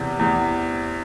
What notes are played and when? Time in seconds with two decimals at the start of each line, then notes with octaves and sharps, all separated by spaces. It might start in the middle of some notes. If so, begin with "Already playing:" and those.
Already playing: E2 C3
0.19 E2